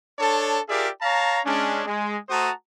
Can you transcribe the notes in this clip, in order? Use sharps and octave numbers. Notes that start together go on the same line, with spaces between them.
D4 A4 C#5 A5
F4 G4 G#4 A#4 D5 E5
C#5 F5 A5 A#5
G#3 C#4 D4
G#3
A3 F#4 C5 A5 A#5 D#6